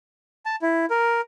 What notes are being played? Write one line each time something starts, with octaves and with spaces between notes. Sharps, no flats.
A5
E4
A#4